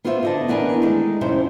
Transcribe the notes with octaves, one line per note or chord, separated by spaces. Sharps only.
B3 F4 F#4 C5 D5 E5
D3 D#5 A5
E2 B3 D4 A#4 B4 G#5
D#3 G#3 A3 A4
F2 C3 D#3 C#4 E4 C5